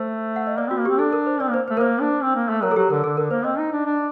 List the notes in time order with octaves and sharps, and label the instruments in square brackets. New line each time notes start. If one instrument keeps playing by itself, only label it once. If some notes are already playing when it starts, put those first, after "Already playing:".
Already playing: [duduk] A3 [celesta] C5
[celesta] F#5
D#5
[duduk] A#3 [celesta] D5
[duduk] C4 [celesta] F#4
[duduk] A#3
[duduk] C4 [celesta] G4
[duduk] D4 [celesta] A4
[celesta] A#4
C5
[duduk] C4 [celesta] D5
[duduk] A#3 [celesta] C5
[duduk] A3 [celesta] C5
[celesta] A#4
[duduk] A#3 [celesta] C5
[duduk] D4
C4
A#3
A3
[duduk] F#3 [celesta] A#4
[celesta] A4
[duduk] F#3 [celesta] G4
[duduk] D3 [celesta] A#4
[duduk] D3 [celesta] A4
[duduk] D3 [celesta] A#4
[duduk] A#3 [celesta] C5
[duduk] C4 [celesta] D#5
[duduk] D#4
D4
D4